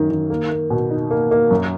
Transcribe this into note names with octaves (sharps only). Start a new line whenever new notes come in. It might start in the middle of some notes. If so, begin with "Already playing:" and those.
Already playing: F#2 D#3 A#3
D#3
A#3
A#3
B2
D#4
A#3
A#3
F#2